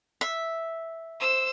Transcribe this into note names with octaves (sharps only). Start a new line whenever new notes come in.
E5
C5 E6